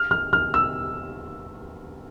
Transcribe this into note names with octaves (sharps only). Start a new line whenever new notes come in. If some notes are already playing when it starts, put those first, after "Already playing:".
Already playing: F6
F6
F6
E6